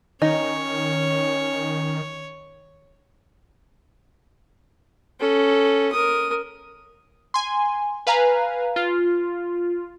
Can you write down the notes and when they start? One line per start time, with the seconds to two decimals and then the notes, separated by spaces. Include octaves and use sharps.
0.22 D#3 C#4 D#4 C#5
5.20 C#4 A4
5.92 A#4 D#6
7.34 G#5 C6
8.07 B4 F5 G#5 A#5
8.76 F4